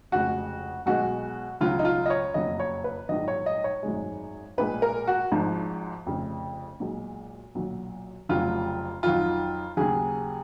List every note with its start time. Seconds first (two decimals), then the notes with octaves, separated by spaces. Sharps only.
0.12 F1 F2 C#3 G#3 F#4
0.86 B1 B2 G#3 F#4
1.61 C#2 C#3 F#3 F4
1.79 D#4
1.85 F4
2.06 D#5
2.10 C#5
2.34 F#1 F2 C#3 F#3 D#5
2.60 C#5
2.84 B4
3.09 A#1 G#2 D#3 F#3 D#5
3.28 C#5
3.46 D#5
3.64 C#5
3.83 G#1 F#2 D#3 G#3
4.58 A#1 A#2 G#3 B4
4.82 A#4
5.07 F#4
5.32 G#1 G#2 F3
6.06 F1 F2 C#3
6.80 B1 A#2 G#3
7.55 B1 A#2 F#3
8.29 F1 F2 C#3 F#3 F4
9.03 F2 D#3 F#3 F4
9.77 D#2 C#3 F#3 G#4